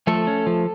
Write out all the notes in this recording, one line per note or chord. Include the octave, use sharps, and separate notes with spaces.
F3 A3 A4
C#4
F3